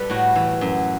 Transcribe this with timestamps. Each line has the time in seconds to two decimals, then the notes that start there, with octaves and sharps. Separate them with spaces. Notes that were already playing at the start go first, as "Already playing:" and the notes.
Already playing: G3 A4 B4
0.10 A2 F#4
0.35 E3
0.61 F#2